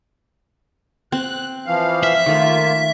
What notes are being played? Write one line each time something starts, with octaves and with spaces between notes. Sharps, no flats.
C4 F#6
E3 F3 F5
E5
D#3 A3 A#3 F4